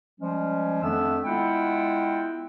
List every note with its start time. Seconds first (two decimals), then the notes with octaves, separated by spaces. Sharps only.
0.20 F3 G3 G#3 C#4
0.81 F2 D#3 A3 B3 D4 E6
1.24 G#3 B3 E4 F4 F#5 G5